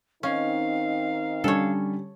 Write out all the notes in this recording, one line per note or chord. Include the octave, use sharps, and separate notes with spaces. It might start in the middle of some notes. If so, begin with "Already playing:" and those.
D#3 C4 C#4 D#4 F5
D3 G3 C#4 A4 C#5